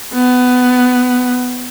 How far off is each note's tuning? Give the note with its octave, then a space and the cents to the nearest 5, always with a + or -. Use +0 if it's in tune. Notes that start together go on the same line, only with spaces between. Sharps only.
B3 +15